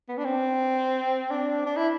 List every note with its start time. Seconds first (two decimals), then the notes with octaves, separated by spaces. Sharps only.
0.09 B3
0.17 D4
0.25 C4
1.30 D4
1.66 D4
1.76 E4